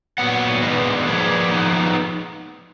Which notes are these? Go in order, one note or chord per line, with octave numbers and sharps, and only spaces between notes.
A#2 F#3 B3 F#5
D#3 G#3 B3 D4 B4 D#5
F3 A#3 D4 G#4 B4
F3 G#3 B3 D#4